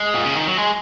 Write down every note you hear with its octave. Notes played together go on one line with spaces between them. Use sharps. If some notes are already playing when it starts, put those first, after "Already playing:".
Already playing: G#3
A#2
C#3
D#3
F#3
G#3